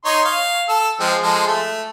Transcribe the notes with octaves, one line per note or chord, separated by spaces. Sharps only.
D#4 C#5 C6
F5
A4 E6
F3 G#3 C4
F3 G#3 A4
A3